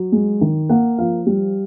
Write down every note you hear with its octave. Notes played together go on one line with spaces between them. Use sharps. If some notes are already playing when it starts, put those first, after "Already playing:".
Already playing: F#3
G#3
D#3
A#3 F#5
F3 F5
G3